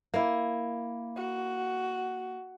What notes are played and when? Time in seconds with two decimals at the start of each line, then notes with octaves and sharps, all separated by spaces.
0.14 A#3 E4
1.16 F#4